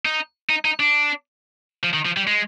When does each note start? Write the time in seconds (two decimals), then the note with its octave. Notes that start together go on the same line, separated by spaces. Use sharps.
0.05 D#4
0.49 D#4
0.65 D#4
0.80 D4
1.84 F3
1.94 D#3
2.05 F3
2.17 G3
2.27 G#3